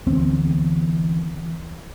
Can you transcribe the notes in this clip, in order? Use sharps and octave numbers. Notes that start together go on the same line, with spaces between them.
D2 E3 B3 C4